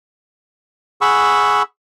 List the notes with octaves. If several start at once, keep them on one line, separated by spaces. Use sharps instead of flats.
G#4 F#5 B5 C#6 E6